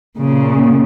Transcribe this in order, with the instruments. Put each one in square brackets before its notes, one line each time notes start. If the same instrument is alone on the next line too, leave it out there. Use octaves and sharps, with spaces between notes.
[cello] A#2 C#3